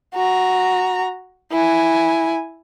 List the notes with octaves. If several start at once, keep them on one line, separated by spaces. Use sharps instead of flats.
F#4 A#5
E4 G#5